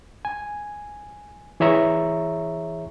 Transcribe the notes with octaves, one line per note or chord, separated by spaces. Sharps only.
G#5
E3 G#4 C#5 E5 A#5 C#6